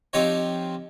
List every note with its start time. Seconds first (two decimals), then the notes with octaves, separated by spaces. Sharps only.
0.13 F3 C4 D#4 F4 G4 C#5